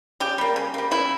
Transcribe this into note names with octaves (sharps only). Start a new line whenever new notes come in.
C#3 G4
G3 A#3
C#3
G3 A#3
C#3 E4